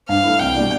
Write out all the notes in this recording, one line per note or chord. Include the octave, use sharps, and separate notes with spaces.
G2 F5
E3 A3 E4
C2 G5
B2 G3 D4